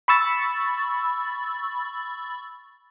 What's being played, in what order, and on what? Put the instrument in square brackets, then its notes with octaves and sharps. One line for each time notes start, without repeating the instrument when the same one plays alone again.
[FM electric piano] B5 C#6 E6 A6